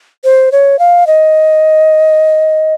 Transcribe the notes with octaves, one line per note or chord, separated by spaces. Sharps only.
C5
C#5
F5
D#5